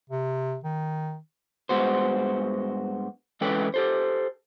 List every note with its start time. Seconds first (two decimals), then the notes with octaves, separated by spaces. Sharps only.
0.10 C3
0.64 D#3
1.69 G2 G#3 B3 F#4 C5
3.41 E3 G#3 C#4 A4 B4 G5
3.74 G4 A4 C5